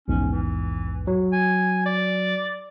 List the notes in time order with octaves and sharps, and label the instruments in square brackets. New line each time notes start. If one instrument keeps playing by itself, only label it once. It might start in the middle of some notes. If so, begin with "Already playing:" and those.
[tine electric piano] A#1 E2 G#2 [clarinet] C#4
[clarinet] E3
[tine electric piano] F#3
[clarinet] G#5
D5